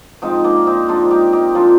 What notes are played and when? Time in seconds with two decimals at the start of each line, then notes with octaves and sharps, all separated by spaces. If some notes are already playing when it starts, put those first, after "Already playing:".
0.22 G#2 F3 C4 D#4
0.44 A#3 D4
0.67 C4 D#4
0.88 G#2 F3 D4 F4
1.10 D#4 G4
1.33 D#4 G4
1.55 A#2 F3 D4 F4